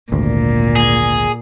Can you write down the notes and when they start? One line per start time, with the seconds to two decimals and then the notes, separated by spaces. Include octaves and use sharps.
0.12 G#1 D2 A#2
0.76 G#4